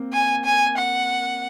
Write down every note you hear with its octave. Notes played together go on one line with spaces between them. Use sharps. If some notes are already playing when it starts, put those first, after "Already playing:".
Already playing: A#3 C4
G#5
G#5
F#5